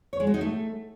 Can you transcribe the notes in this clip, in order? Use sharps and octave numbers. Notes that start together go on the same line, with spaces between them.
C#5
G#3
F#4
D#4
A3